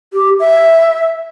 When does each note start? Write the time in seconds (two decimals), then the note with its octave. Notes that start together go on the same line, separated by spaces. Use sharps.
0.13 G4
0.40 E5